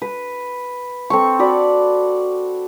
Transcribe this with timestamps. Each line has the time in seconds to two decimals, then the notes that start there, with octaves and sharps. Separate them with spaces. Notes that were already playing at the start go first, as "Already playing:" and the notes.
0.02 B4
1.10 C4 A4 C#6
1.39 F#4 D5 B5